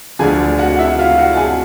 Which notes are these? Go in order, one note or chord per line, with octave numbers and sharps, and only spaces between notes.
D2 D3 F3 G#4 G#5
F#4 F#5
E4 E5
F4 F5
F#4 F#5
A5
G#4 G#5